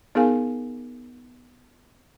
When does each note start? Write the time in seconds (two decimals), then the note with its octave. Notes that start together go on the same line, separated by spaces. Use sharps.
0.15 B3 D#4 G#4 A#4 F5 G#5